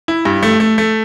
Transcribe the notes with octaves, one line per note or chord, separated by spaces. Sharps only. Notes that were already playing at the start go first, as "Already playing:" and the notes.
E4
G2
A3
A3
A3